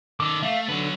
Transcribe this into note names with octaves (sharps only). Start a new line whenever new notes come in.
D#3 A4 D6
A3 E5 F5
D3 F#3 B4